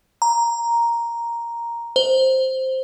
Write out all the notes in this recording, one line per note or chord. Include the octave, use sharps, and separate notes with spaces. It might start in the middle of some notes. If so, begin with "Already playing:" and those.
A#5
C5